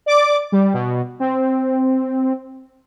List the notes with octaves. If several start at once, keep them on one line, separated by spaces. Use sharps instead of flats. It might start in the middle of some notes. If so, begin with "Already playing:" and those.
D5 D6
G3
B2
C4